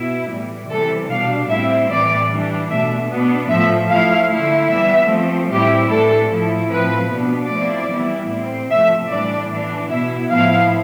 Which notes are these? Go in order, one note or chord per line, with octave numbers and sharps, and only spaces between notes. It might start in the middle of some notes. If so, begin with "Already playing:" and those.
Already playing: B2 B3 E4
A2 E3 G3
C3 E3 G3 A4
B2 G3 D4 F5
A2 G3 C4 E4 E5
A2 E3 G3 D5
E3 G3 D4
B2 A3 D4 E5
B2 B3 D4
A2 F3 A3 E5
F3 A3 E4 F5
D3 A3 E4
E3 G3 B3 E5
F3 A3 C4
A2 E3 G3 C4 E4 G4
A2 E3 A3 D4 A4
A2 F3 A3 E4
A2 F3 C4 B4
B2 B3 D4
F3 A3 C4 E4 D5
E3 G3 B3 E4
A2 G3 C4
C3 F3 A3 E5
A2 E3 G3 D4 D5
E3 B3 D4
B2 B3 E4 E5
A2 F3 B3 E4 F5